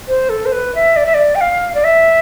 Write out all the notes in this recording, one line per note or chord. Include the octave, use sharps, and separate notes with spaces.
C5
A4
C5
B4
E5
D5
E5
D5
G5
F5
D5
E5